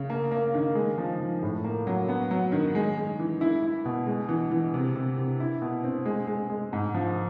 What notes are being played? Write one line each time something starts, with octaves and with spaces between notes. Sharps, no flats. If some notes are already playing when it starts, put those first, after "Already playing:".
Already playing: C#3
A#3
A#3
D#3
G#3
F3
F3
A2
A#3
F#3
B3
F#3
D#3
G#3
G#3
E3
E4
E4
B2
G#3
E3
E3
C3
C3
C3
E4
B2
C4
G#3
G#3
G#3
G#2
F3